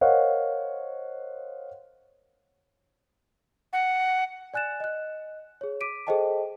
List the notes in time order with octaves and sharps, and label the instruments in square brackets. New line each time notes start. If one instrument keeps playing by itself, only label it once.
[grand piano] A#4 C5 C#5 D#5 F5 F#5
[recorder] F#5
[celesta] D5 G#5 F#6 A6 E7
D#5 F#6
G#4 C#5
D6 B6 D7 D#7
G#4 A4 C5 D#5 G5 A5